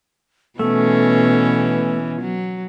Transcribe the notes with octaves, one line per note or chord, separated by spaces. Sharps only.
B2 E3 A3 B3 C#4
F#3